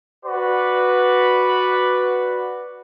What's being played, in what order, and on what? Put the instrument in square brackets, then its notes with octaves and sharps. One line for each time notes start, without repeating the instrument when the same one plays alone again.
[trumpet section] F#4 B4 D5